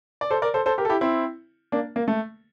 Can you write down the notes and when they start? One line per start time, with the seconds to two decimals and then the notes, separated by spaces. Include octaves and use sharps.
0.21 D5
0.30 A4 C5
0.42 A#4 D5
0.54 A4 C5
0.66 A4 C5
0.78 G4 A#4
0.85 A4
0.89 E4 G4
1.01 C4 E4
1.72 A#3 D4
1.96 A#3
2.08 A3